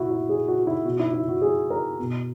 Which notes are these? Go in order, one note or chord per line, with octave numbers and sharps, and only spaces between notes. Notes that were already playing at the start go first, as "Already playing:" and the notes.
Already playing: A#2 E4 F#4
E4
G#4
F#4
F#4
E4
B2 F#4
E4
E4
F#4
G#4
A#4
B2